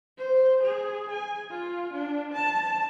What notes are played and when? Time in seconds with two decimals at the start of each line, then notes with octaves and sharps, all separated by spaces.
0.18 C5
0.63 G#4
1.11 G#5
1.51 F4
1.93 D4
2.34 A5